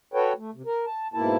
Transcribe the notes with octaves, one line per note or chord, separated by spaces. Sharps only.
F#4 A4 B4 C#5 G5
A3
C3
A#4
A5
G#2 B2 A#3 E4 A5